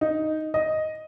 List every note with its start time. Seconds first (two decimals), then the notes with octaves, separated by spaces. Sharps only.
0.01 D#4
0.54 D#5